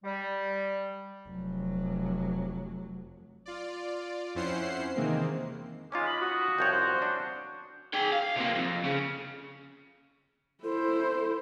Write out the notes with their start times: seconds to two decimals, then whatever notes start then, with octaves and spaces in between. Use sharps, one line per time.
0.04 G3
1.28 F1 F#3
3.46 F4 D5
4.35 F2 C#4 E4 C5 F#5 C7
4.96 C3 D#3 E3 G#3 A#3 C4
5.92 G#3 C#4 D#4 F4 D6
6.06 D#5 B5
6.21 F#4 D#6
6.59 C2 F3 C#5 G5
6.72 C5
6.99 C#4 D4
7.94 G#4 G5
8.12 F5
8.36 C3 A#3
8.56 F2
8.84 C#3
10.64 E4 A4 C5